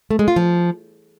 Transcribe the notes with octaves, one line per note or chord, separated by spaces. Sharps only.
A3
G#3
F4
F3